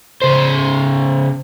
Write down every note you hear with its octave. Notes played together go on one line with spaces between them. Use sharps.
C#3 C5